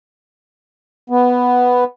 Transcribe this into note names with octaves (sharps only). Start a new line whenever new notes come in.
B3